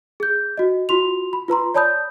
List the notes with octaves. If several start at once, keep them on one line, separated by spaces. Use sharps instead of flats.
G#4 G6
F#4 D#5
F4 F#4 C6 F7
B5
F4 B4 A#5 C6
C#5 D5 A5 B5 D#6 G6